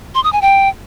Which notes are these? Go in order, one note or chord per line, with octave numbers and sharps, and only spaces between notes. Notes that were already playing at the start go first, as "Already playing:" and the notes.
C6
D#6
G#5
G5